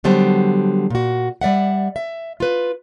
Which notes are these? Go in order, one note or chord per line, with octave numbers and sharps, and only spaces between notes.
D3 F#3 G3 B3 C5 A5
A#2 F#4
G3 D5 E5 F#5
E5
F4 B4